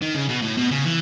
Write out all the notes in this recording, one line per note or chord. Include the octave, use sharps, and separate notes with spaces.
D#3
C#3
B2
A2
B2
C#3
E3